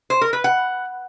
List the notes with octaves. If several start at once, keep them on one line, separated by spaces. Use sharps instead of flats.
C5
A#4
B4
F#5